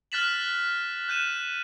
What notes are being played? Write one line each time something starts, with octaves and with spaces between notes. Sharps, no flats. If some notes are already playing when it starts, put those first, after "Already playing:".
F6 F#6 A6 B6 E7 F#7
F#6 G6 D#7 E7